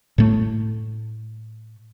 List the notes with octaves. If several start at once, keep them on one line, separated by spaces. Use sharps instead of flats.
A2 A3